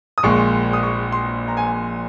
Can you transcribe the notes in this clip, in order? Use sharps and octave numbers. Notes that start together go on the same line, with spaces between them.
D#6
A#1 A#2 G#3 C#6
D#6
C#6
C6
A#5
G#5